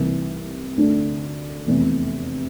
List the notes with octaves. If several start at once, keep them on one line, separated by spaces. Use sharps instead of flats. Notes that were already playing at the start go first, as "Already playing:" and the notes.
Already playing: C2 C3 E3
D2 D3 A3 D4
F1 E2 C3